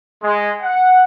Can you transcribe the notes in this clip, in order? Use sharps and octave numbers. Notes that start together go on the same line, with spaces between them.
G#3
F#5